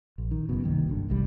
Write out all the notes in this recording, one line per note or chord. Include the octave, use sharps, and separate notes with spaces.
A#1
D#3
F#1 F#2 B2
C2 D#3 A#3
G#1 G2 D3
G1 C2 G3